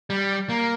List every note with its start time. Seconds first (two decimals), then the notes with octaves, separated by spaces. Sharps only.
0.10 G3
0.49 A#3